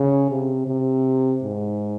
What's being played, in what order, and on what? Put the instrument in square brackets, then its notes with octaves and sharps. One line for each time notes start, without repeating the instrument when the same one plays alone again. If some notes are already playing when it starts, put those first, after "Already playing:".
Already playing: [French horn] C#3
C3
C3
G#2